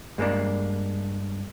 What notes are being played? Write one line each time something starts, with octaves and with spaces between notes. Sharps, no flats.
G2 G#3 A#3 B3 D4